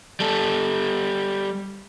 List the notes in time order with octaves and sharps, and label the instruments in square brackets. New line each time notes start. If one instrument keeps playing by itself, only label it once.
[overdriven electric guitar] G3 A4